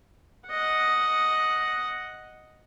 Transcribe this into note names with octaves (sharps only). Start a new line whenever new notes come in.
D#5 F#5